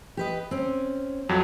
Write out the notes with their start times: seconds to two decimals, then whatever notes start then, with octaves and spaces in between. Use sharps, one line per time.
0.17 G4 B4 D#5
0.51 C4 C#4
1.29 F2 F#3